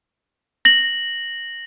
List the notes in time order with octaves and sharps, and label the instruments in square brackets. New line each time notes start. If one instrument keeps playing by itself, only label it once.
[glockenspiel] A#6 F#7